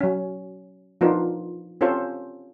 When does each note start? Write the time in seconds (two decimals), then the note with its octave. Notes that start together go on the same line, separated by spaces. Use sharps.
0.01 F#3 C#4
1.01 F3 B3 D4 D#4 F4 A#4
1.81 C4 C#4 F4 G4 A4 C5